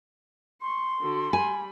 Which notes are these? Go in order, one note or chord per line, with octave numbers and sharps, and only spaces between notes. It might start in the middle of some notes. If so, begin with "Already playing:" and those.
C6 C#6
D3 F#4
G3 G#5 B5